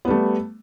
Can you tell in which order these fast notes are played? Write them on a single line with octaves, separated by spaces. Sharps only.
B3 G3 A3